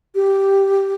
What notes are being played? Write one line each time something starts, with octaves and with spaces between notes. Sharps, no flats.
G4